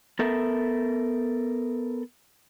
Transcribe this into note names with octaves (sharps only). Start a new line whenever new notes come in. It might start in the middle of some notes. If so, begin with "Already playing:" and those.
B3 A4 A#4 E5